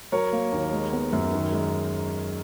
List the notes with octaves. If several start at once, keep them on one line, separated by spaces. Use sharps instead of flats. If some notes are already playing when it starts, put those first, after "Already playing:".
F#3 A#4 C#5
A#3
D#2
G#3
B3
F#2
D#3
G#3